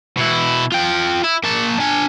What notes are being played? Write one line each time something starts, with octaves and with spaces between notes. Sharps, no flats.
B2 E4
F4 G5
E4
A#3 A5
D4 G#5